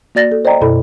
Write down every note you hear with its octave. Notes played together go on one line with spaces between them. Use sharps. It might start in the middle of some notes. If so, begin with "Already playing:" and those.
A#3 F#4 D5 A6 A#6
A4
C5 D5 D#5 G5 A#5
F#2 B2 E4 A4 B5